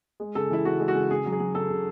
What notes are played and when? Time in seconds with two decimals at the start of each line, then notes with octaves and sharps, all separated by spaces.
0.20 G#3
0.35 C#3 A4
0.50 E3 E4
0.65 C#3 F#4
0.80 G#3
0.88 F#4
0.95 C#3
1.10 C#3 G#4
1.26 F#3
1.32 G#4
1.40 F#3
1.55 C#3 A4
1.70 C#3